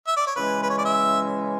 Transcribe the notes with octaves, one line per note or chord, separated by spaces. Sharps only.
E5
D5
C#5
C#3 E3 G#3 C#4 B4
B4
C#5
D5
E5